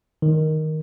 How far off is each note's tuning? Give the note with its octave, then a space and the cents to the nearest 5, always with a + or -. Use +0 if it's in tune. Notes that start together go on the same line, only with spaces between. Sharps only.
D#3 +5